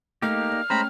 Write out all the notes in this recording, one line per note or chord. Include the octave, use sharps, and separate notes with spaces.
A3 A#3 D#4 G4 D#5 F6
D5
G#3 A3 C#4 C5 G5 A#5 B5